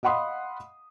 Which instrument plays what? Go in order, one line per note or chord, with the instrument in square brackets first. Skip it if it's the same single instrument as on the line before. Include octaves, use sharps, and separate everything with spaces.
[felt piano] D#5 F5 F#5 B5 C6 D#6